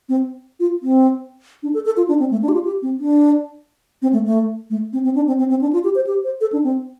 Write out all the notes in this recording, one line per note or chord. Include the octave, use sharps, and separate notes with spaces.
C4
F4
C4
D4
A4
A4
F4
D4
C4
A3
D4
G4
F4
G4
C4
D4
C4
A3
A3
A3
C4
C4
D4
C4
C4
C4
D4
F4
G4
C5
G4
C5
A4
D4
C4